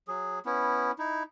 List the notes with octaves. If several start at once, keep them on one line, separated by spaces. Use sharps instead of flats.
F#3 G#4
B3 C#4 E4
D#4 E4